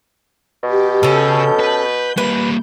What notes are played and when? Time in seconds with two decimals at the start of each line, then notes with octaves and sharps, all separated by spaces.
0.63 B2 G4
1.03 C#3 C#4 A4 G6
1.59 B4
2.18 G3 A#3 B4